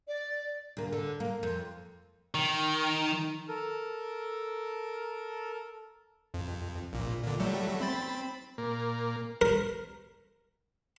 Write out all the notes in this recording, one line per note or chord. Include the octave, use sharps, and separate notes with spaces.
D5
D2 A#3
D3
A#3
F2
D#3
A4 A#4
F2
A#1 A#2
A#2 D3
F#3 G3 A3
C4 B5 A6
A#2 A#3
A#4